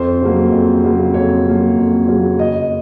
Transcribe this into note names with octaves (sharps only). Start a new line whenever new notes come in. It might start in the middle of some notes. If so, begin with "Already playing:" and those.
Already playing: F2 C5
C#3 F#3 A#3
F2
C#3 F#3 A#3
F2 C#5
C#3 F#3 A#3
F2
C#3 F#3 A#3
F#1 D#5